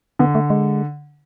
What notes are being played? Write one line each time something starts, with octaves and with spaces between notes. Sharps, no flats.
D3 B3
A3
G#3